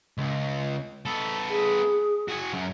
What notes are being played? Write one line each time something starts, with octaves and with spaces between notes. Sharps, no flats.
C#2
B3 A4
G#4
F#4 G#4
F#2 F#3